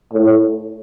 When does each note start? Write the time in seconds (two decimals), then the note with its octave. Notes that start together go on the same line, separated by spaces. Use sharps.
0.13 A2